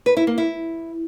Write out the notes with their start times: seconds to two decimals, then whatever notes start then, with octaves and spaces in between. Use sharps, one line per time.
0.06 B4
0.17 E4
0.27 A#3
0.38 E4